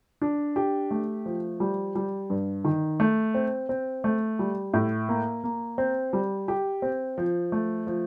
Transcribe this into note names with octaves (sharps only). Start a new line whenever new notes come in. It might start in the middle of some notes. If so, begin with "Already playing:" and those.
D4
G4
A3
F3
G3
G3
G2
D#3
A3
C4
C4
A3
G3
A2
A#3
A#3
C4
G3
G4
C4
F3
A3
F3